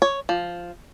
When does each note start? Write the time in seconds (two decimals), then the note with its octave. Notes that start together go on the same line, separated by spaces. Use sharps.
0.02 C#5
0.29 F3